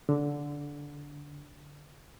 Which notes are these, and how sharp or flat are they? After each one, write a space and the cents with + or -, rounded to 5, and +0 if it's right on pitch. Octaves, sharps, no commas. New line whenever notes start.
D3 -15